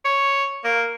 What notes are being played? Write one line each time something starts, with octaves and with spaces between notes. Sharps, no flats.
C#5
A#3